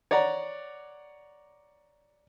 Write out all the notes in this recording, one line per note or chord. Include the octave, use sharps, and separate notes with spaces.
C#5 D5 F#5 A#5